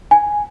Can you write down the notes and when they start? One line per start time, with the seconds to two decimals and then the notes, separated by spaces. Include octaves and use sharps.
0.11 G#5